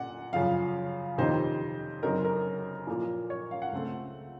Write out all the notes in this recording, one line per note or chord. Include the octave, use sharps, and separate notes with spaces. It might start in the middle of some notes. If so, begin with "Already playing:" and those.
Already playing: A#2 F#5
F#2 C#3 F3 F5
F2 C3 D#3 A#3 D#4 C5
F#2 C#3 F#3 C4 D#4 A#4
A#4
A#2 F3 A#3
C#5
F5
F#5
C#2 C#3 A3 C4